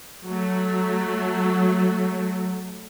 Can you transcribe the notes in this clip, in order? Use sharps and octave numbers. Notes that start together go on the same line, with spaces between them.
F#3 A3